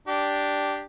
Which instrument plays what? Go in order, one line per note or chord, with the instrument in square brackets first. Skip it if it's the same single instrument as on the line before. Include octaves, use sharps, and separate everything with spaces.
[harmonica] D4 G4